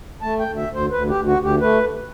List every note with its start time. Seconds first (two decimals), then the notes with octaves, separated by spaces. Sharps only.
0.22 A3 A5
0.40 G5
0.45 D2
0.57 E5
0.68 D2
0.74 C5
0.91 D2 B4
1.09 G4
1.14 D2
1.26 F#4
1.38 D2
1.43 G4
1.60 A3 B4